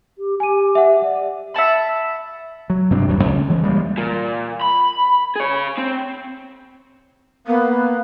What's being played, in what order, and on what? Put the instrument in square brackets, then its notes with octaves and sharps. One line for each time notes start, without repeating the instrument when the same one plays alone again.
[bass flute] G4
[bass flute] G4 [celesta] G#5 D#7
[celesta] E5 F#5
[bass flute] D5
[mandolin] E5 F#5 A5 B5
[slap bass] F#3
G2 C3 C4 D4
D#1 D#2 F#3 G3
C#2 C#4
D2 E3 G#3
E3 G3 G#3 A#3
[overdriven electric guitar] A#2
B5
G#4 C#5
C4
[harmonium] A#3 [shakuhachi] B3